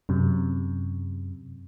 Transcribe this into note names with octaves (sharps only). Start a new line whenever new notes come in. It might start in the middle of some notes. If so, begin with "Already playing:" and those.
F#2 C3